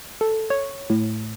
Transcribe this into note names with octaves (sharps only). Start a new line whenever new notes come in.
A4
C#5
A2